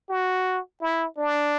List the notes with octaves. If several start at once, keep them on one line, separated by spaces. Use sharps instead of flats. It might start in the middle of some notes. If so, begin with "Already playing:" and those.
F#4
E4
D4